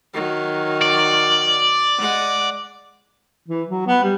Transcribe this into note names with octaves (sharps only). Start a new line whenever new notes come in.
D#3 F#3
D5
G#3 F#5
E3
F#3
B3
G3